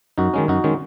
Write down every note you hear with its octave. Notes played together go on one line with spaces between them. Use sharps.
F#2 D#4 F#4
D#3 G#3 C#4
F#2 D#4 F#4
D#3 G#3 C#4